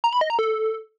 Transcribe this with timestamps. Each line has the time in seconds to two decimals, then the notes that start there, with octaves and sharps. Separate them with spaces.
0.04 A#5
0.13 B5
0.21 D#5
0.30 A#5
0.39 A4